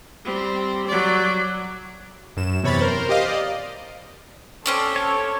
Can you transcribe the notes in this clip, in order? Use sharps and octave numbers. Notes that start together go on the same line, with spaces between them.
G3 C4
F#3 D5
F#2 E7
E2 C3 C#5 B5 A6
A#4 C5
G4 C5 D#5 F5
D5 D#5
C4 C#4 A4 D5
C#5